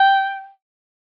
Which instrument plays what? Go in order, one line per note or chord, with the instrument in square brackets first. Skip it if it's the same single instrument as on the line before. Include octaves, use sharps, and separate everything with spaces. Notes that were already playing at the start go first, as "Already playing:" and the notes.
Already playing: [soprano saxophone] G5